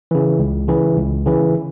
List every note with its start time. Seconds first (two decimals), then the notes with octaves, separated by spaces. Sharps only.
0.11 C#3 E3
0.39 C#2
0.68 C#3 E3
0.97 C#2
1.26 C#3 E3